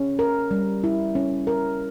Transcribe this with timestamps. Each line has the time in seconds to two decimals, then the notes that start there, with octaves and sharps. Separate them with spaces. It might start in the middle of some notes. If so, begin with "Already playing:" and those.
Already playing: C#4
0.19 A#4
0.51 G3
0.84 E4
1.15 C#4
1.47 A#4